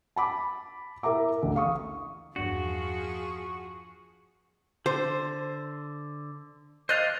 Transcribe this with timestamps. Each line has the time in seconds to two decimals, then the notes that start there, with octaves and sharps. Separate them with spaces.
0.16 A5 B5 D6
1.03 E4 A#4 E5 A#5 D6
1.42 A1 D2
1.56 F5 C#6 D#6
2.36 E2 G2 F3 D4 F#4 G#4
4.86 D3 C5
6.89 C5 D5 D#5 F5 F#6